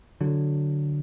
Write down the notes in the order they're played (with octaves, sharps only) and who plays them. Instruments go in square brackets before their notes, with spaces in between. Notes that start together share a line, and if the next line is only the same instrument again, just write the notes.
[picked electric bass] D3 F#3